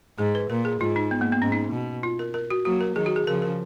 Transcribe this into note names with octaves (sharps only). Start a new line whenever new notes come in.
G#2 G#4
B4
A#2 A#4
G#4
G#2 F4
D#4
B3
A#3
B3
G#2 C#4
D#4
B2
F4
A#4
A#4
F#4
F#3 A#3 F#4
A#4
D#3 F#3 G#4
F#4
G#4
C#3 F3 A#4
A#4